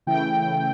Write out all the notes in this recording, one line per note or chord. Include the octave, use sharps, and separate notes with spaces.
C#3 E3 A3 E4 G5